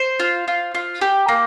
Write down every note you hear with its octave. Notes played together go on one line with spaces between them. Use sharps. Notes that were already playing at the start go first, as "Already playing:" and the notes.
Already playing: C5
F4
F4
F4
G4
A#3